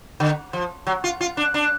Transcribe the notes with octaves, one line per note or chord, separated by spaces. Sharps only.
D3
F3
F#3
F4
F4
D4
D4